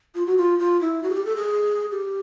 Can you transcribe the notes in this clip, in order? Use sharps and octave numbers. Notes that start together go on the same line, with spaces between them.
F4
F#4
F4
F4
E4
F#4
G#4
G4
A4
G#4
G4